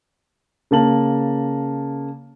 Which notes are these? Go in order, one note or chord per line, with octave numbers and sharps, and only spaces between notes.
C#3 A#3 A5 F#7